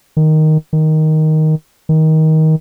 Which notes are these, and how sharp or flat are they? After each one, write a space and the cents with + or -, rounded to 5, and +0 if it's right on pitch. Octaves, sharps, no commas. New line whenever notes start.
D#3 +0
D#3 +5
D#3 +20